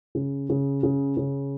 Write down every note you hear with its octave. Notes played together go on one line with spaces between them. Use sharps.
C#3
C#3
C#3
C#3